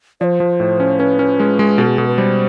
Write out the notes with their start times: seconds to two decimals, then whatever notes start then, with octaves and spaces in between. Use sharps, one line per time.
0.21 F3 C5 D5
0.40 F3
0.60 A2
0.80 C#4
0.99 C#4 B4
1.19 C#4
1.40 G#3
1.59 G#3
1.78 B2 A4
1.89 G#4
1.98 B2 A4
2.07 B4
2.18 G3 C5